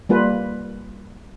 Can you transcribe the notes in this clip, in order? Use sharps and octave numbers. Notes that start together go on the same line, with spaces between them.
G3 A#3 F4 B4